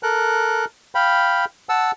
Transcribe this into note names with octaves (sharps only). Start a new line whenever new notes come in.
A4 A#4 F#6
F5 G5 B5
F#5 A5 E6